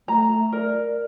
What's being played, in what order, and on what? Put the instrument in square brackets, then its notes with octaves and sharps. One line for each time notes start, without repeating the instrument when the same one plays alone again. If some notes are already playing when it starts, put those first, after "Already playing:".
[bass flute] A3 [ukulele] A#5
[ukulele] A#4 [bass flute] D5